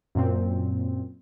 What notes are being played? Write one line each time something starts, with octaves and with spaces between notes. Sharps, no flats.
F#2 A#2 C4